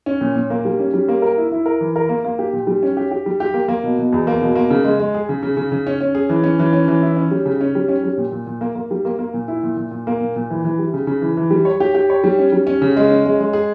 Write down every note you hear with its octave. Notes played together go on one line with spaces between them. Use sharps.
C#4
A#2
A#2
A#3
G3
C#4
G3
A#3
A#4
E4
E4
A#4
E3
A#4
A#3
A#3
G4
A#2
G3
C#4
G4
G4
G3
G4
A#3
A#3
B2
B2
E2
A#3
B2
A#3
C#3
G#3
G#3
G#4
C#3
C#3
C#3
C#3
C#4
C#4
G#4
E3
C#4
E3
C#4
E3
E4
C#4
G3
C#3
C#4
G3
C#4
G3
A#2
A#2
A#2
A#3
A#3
G3
A#3
A#3
A#2
E4
A#2
A#2
A#2
A#3
A#2
A#2
E3
E3
G3
C#3
C#3
E3
E3
G3
C#5
G4
G4
C#5
G3
C#4
G3
C#4
C#3
G#3
C#4
G#3
G#3
G#4